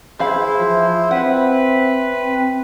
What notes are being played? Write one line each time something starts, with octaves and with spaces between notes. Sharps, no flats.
E3 E4 G#4 C5 F5 B5
F3 E5
C4 B4 F#5
C4 G5